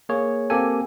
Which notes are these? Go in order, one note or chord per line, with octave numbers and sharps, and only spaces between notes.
A#3 G#4 C#5
A#3 C4 G4 A4 G#5